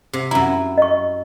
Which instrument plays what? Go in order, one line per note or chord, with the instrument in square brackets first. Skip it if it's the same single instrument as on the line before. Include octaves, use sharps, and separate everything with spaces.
[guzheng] C3
[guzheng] F#2 E4 [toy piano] A#5
[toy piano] D#5 C#6